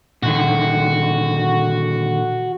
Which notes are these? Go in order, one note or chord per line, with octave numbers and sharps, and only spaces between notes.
A#2 D3 D#3 F#4